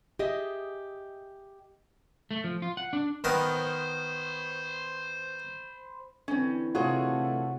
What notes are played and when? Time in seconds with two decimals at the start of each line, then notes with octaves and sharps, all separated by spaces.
0.19 G4 G#4 D#5 E5
2.31 A3
2.44 F3
2.62 F4
2.77 F#5
2.93 D4
3.24 D#3 B3 A#4 C5 B5
6.28 D3 E3 C4 C#4
6.75 C3 A3 F4 F#4 G#4 C#5